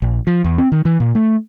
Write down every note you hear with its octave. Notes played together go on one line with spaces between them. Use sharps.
A#1
F3
E2
C4
D#3
E3
A#2
A3